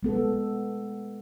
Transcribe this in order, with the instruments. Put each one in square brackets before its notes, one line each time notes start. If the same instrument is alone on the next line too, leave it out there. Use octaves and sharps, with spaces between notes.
[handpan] G#3 B3 A4